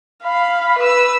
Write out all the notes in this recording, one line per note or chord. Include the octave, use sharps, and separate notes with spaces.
F5 B5
B4 E6